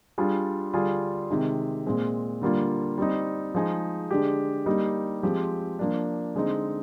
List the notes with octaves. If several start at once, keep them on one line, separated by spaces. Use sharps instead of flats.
G3 D4 F4 G#4
D3 G3 D4 F4 G#4
C3 D#3 G#3
A#2 G#3 C4
D3 G3 A#3 F4
G3 C4 D#4
F3 G#3 D#4 G#4
D3 G#3 D4 G4
G3 A#3 D#4 G4
F3 G#3 C4 G4
F3 A#3 D4
D3 G#3 C4 D#4